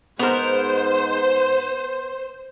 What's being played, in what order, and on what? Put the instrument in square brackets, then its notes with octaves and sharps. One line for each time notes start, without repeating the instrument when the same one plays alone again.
[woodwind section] G#2 [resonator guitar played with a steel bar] B3 A#4 [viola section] C5